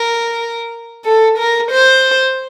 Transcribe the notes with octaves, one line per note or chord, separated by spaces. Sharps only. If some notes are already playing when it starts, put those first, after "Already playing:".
Already playing: A#4
A4
A#4
C5